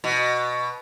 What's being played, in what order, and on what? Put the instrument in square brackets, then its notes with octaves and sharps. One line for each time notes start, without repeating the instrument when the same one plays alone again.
[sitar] B2